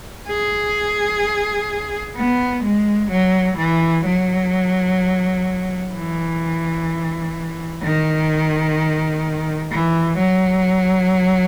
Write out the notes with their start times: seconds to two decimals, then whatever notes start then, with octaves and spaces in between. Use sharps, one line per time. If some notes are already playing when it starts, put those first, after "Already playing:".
0.28 G#4
2.16 B3
2.64 G#3
3.11 F#3
3.58 E3
4.05 F#3
5.93 E3
7.82 D#3
9.71 E3
10.18 F#3